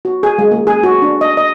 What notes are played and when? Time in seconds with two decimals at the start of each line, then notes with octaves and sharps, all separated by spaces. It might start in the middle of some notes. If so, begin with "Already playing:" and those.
0.05 F#4
0.23 G#4
0.38 G#3
0.51 A#3
0.67 G#4
0.83 F#4
1.02 D4
1.21 D#5
1.37 D#5